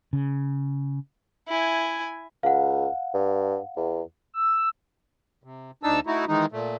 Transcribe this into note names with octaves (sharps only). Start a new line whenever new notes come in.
C#3
E4 G#5
C#2 F5 F#5
G2
E2
E6
C3
D2 D4 D#4 A5 E6
A3 D#4 E4 F#4
D#3 E3 G#3 D#4
A#2 A3